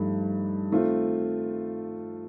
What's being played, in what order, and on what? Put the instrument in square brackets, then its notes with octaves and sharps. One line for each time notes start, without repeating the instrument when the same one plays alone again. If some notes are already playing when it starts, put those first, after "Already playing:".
Already playing: [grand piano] G2 F3 A3 D#4
D#3 A3 C4 F4